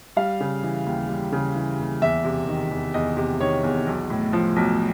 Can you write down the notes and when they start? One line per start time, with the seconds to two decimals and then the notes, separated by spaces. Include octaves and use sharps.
0.17 G3 F5
0.40 C#3
0.63 E3
0.86 D#2
1.09 G3
1.32 C#3
1.55 E3
1.79 D#2
2.02 E2 E5
2.24 C3
2.48 D#3
2.71 E2
2.94 E2 D#5
3.17 C3
3.40 D#3 C#5
3.63 E2
3.87 B1
4.10 A2
4.33 F3
4.56 B1